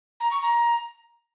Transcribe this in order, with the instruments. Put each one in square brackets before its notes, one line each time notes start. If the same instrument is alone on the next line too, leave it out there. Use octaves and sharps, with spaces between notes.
[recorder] A#5
C#6
A#5